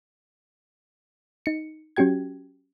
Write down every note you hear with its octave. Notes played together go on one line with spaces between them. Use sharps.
D#4 C#7
F#3 C#4 F#4 G4 G5 G#6